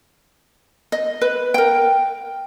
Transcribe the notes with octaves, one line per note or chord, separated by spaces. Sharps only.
D#5
B4
A#4 G5